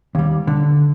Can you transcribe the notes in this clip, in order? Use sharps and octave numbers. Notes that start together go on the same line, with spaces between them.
D#2 G3
D3